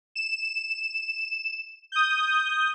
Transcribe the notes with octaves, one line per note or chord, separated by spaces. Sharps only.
E7
D#6 G6